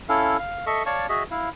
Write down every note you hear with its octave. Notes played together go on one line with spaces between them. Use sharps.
C#4 E4 A4 F5
F5
A4 D#5 E5 C#6
C#5 D5 F5 A5 C#6
F#4 G#4 D#5 E5
E4 F5